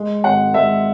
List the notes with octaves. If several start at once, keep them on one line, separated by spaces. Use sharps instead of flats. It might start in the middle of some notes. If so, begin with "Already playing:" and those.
Already playing: G#3
G#1 F#5
G#3 E5